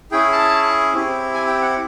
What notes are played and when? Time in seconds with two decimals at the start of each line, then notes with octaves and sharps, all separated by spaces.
0.12 C#4 E4 G#4 G5
0.32 A5
0.93 C4 E4 G4
1.34 G#5
1.47 G5
1.62 F#5